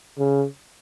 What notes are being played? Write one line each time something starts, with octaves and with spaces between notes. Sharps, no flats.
C#3